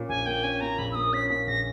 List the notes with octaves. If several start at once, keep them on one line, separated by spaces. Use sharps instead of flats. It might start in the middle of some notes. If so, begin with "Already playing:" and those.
Already playing: A#2 C#4
A#1 G#5
A#3 G5
C#4 G#5
A#2 A#5
A#1 B5
E6
A#3 D#6
C#4 B6
A#2 B6
A#1 A#6